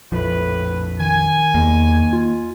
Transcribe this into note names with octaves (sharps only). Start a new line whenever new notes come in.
A#1 F2 A2 F3 B4
D#3 G#5
E2 D#3 A#3
F4